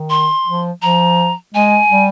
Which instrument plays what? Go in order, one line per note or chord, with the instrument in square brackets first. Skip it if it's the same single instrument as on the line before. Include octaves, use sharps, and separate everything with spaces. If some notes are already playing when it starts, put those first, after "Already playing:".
Already playing: [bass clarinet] D#3
[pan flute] C6
[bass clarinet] F3
[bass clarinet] F3 [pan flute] A#5
[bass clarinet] G#3 [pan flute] G#5
[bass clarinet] G3